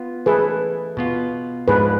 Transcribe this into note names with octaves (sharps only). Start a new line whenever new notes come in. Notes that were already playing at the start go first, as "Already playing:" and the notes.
Already playing: B3 F4
E3 A3 E4 G#4 A4 B4
B2 B3 F4
G#2 F3 G#3 D4 G#4 B4